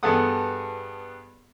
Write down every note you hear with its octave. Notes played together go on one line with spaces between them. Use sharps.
G2 B3 G#4 A4 F#5 D#6